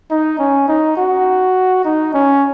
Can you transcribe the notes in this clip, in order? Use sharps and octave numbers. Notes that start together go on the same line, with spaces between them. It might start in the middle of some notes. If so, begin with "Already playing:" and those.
D#4
C#4
D#4
F#4
D#4
C#4